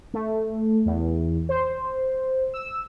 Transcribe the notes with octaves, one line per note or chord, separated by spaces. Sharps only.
A3
E2
C5
E6